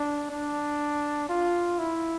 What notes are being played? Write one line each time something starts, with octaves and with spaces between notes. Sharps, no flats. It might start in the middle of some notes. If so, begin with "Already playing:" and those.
Already playing: D4
D4
F4
E4